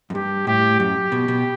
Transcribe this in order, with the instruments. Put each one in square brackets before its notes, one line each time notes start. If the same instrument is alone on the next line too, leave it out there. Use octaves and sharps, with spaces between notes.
[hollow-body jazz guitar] F#2
[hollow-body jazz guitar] G2 [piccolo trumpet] G4
[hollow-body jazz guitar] A2 [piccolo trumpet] G4
[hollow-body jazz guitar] F#2 [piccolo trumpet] G4
[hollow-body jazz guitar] B2
B2